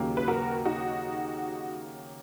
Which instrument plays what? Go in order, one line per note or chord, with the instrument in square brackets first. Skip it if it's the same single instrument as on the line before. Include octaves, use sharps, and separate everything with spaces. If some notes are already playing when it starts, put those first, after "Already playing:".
Already playing: [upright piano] D#2 C#3 F#3 A#3
[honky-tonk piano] B4
F#4 A#4
D#4 F#4